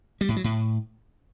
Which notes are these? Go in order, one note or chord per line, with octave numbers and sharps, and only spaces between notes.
G3
A2
F#3
A2